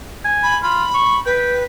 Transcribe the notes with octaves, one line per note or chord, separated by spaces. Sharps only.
G#5
B5
F4 B5
C#6
B4 G5